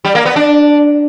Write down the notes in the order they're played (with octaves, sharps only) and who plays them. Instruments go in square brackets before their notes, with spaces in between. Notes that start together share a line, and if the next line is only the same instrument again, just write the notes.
[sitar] G3
A#3
B3
D4